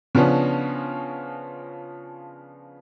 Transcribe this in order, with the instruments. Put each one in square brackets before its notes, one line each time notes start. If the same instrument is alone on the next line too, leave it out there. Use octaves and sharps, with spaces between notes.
[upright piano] C#3 F3 B3 C#4 D4